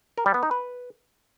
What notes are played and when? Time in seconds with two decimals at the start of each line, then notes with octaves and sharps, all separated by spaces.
0.18 A#4
0.26 G3
0.34 B3
0.43 D#4
0.51 B4